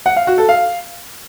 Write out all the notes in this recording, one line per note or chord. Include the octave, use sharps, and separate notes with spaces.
F#5
F5
F#4
A4
F5